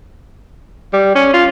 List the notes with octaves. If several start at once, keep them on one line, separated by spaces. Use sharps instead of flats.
G3
C#4
F4